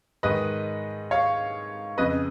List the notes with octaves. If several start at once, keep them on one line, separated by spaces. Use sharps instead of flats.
G#2 D#3 B4 D#5
C#5 F5
F2 C#3 B4 D#5